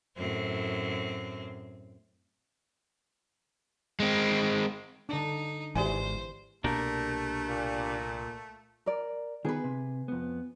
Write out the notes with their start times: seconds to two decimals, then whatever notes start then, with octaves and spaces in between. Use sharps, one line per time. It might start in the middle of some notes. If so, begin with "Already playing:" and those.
0.17 F#2 A2 C4
4.00 G#3 C4
5.09 D3 D4 D#4
5.75 G#1 E3 G4 C5 D5 G#5
6.64 C2 B2 A3 A#3 D4 G4 A#4
7.47 A#2
8.86 A#4 D5
9.45 D#3 B3 G#4 B4
9.64 C3
10.08 F2 B3